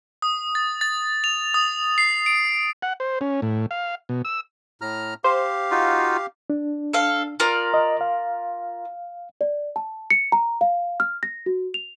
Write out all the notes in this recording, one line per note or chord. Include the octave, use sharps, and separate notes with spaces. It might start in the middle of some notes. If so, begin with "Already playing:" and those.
D#6
A6
A6
F7
D#6
C7
D7
F#5
C5
C#4
A2
F5
B2
E6
A2 A#5 F6
G4 C5 F5
D#4 F4 F#4
D4
A4 F5
F4 A#4 D5
D#5
F5
D5
A5
C#7
A#5
F5
F6
A#6
F#4
F7